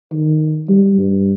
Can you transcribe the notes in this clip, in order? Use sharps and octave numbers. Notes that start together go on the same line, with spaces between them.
D#3
G3
G2